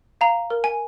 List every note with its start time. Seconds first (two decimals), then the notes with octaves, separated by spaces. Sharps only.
0.21 F5 A#5
0.50 A#4
0.64 G#5